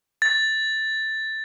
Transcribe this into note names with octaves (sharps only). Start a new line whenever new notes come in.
A6